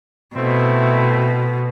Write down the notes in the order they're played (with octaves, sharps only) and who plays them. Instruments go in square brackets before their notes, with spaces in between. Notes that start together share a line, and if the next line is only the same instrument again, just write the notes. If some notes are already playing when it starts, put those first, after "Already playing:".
[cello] B2 [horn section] A3 C4 E4